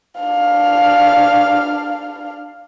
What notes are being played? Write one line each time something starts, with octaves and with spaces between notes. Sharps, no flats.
D4 F5